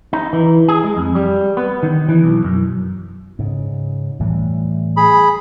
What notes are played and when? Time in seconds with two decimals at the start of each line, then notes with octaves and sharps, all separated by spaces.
0.13 D#4
0.33 E3
0.68 G#4
0.84 G#3
0.97 F2
1.15 G3
1.57 B3
1.83 D#3
2.09 E3
2.24 B1
2.44 F#2
3.39 G#2 C#3
4.20 A2 E3 G3
4.97 G#4 B5